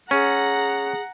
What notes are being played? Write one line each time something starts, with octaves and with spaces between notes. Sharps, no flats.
C#4 G#4 F#5 A#5